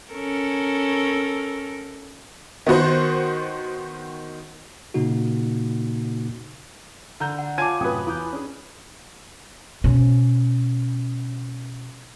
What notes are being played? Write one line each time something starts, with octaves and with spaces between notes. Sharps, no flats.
C#4 A4 A#4
D#3 B3 F#4 C5
A#2 C#3 A#3 D#4 F#4
D3 A#5 G6
F#5
F4 C#5 G#5 A5 C6 D6 G#6 D#7
F#2 A2 C3 F#4 B4 G5 D#6
E2 E4 D6 G6
C#4 D4 G#4
B2 C#4